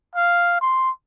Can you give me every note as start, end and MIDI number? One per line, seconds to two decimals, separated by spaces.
0.16 0.60 77
0.61 0.91 84